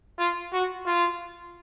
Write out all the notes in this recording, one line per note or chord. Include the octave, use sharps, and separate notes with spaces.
F4
F#4
F4